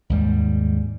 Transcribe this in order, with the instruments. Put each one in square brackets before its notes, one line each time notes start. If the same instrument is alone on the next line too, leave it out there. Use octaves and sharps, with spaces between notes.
[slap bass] D#2 G#2 G3